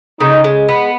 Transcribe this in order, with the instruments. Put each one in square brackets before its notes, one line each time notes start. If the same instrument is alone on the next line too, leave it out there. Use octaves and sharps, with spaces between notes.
[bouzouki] C#3 [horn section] D#4
[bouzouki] G#3
B3